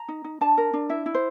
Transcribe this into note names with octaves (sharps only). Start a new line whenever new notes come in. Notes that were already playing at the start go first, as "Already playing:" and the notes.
Already playing: A#5
D#4
D#4
D4 A5
A#4
D4
E4 E5
E4
C5